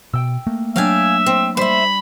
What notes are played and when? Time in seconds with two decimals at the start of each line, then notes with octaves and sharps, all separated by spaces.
0.13 B2 G5 E6
0.47 A3 A#3
0.76 F#3 D4 E5 F5 G5 G#5
1.26 C4
1.57 G3 C5 E5 B5